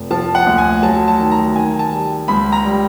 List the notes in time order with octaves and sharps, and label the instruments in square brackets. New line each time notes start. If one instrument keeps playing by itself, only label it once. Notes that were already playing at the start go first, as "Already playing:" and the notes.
Already playing: [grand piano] F1
F3 A5
F#5
D2
G#5
F#3 A5
A5
D#3
A#5
D#3 G#5
A5
G3
C#2 B5
A#5
G3